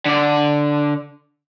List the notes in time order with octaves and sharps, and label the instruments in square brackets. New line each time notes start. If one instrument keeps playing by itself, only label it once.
[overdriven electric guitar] D3 D5